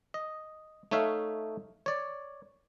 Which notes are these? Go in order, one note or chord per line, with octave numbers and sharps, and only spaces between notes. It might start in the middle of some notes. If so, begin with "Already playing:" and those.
D#5
A3 D#4 C#5 E5 F5
C#5 D5